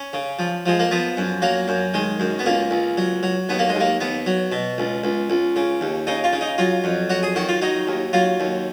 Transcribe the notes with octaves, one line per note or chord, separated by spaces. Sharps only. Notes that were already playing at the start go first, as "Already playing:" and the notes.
Already playing: C#4
C#3
F3
F3 G#3
A#3
F3 B3
F#2
F#3 A#3
F#2
D#3 G#3
F#2
B3
C#2 A#3
C#2
F#3
F#3
D#2 B3
A#3
G#3
D#2
A#3
D#2 B3
F#3
B2
C#2
C#2
C#2
C#3
D#2
C#3 D#4
F4
C#3
D#4
F#3 F4
F2
F#3 F#4
G#4
D#3 F#4
F4
F#3 D#4
D#2
F#3 F4
D#2